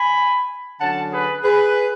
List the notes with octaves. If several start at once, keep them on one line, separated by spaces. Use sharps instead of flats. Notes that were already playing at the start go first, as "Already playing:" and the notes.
Already playing: G#5 B5
D3 F#3 C#4 F#5 A5
G#4 B4
G#4 B4